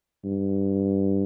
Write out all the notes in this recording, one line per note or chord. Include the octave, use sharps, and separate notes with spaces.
G2